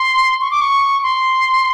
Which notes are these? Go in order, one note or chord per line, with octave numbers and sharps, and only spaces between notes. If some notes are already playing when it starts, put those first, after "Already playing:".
Already playing: C6
C#6
D6
C#6
C6